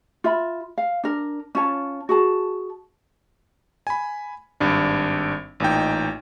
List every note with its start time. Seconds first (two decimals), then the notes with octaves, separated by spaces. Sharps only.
0.24 F4 E5 B5
0.78 F5
1.04 D4 A#4
1.55 C#4 F4 C#5 A5
2.09 F#4 G#4 A5
3.87 G#5 B5
4.60 G#1 G2 D4
5.60 A1 A#2 D#4 G5